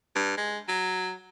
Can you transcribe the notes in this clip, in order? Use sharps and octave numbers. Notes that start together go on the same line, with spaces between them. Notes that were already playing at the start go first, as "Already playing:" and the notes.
G2
G#3
F#3